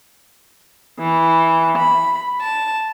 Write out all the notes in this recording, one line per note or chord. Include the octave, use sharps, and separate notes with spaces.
E3
B5
A5